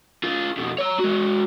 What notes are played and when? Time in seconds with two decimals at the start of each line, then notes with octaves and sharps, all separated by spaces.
0.23 F4 G#4
0.57 F2 B2
0.78 C#5 A#5
0.99 G#3 F#4